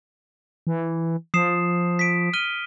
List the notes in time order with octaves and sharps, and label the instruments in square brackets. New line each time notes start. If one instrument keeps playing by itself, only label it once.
[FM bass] E3
[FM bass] F3 [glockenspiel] D#6 C7 E7
[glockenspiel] B6 D7
F6 D#7 G7